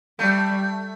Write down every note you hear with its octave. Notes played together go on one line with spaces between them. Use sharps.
G3 A3